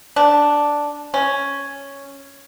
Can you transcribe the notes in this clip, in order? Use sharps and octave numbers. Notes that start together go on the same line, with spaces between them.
D4
C#4